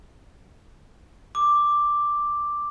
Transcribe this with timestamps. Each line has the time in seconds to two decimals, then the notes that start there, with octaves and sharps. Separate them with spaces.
1.35 D6